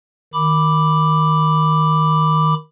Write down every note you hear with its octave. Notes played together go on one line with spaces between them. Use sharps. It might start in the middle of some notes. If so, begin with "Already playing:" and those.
D#3 B5 D6